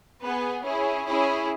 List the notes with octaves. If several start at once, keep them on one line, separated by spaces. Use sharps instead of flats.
B3 G#4 B4
C#4 E4 G#4
C#4 E4 G#4